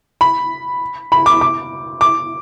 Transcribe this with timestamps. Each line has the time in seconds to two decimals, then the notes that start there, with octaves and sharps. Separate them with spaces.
0.21 B5
1.12 B5
1.26 D6
1.41 D6
2.01 D6